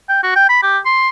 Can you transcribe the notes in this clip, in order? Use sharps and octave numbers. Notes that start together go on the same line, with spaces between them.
G5
F#4
G5
B5
G4
C6